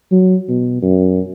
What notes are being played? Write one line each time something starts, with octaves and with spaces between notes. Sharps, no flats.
F#3
B2
F#2